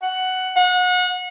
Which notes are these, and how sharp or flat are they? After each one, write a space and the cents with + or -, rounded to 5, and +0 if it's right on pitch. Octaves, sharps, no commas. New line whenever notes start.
F#5 +10
F#5 -30